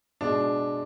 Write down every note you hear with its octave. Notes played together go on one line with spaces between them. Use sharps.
B2 G#3 D4